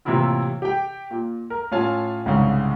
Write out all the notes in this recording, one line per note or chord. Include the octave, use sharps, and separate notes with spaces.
A2 C3 E3 A#3 E4 F4
G4 G5
A#2
A#4
A2 C#4 F4 F5 G#5 A5
C2 G#2 C#3